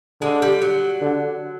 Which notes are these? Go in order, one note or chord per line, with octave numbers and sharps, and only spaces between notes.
D3 G#3
G3
F#3
D3